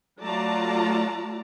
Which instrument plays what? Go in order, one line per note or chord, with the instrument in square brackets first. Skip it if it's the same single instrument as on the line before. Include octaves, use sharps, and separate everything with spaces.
[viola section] F#3 A3 F4 D5 A5 A#5